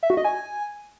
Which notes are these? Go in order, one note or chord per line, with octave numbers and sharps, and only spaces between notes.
E5
F#4
D#5
G#5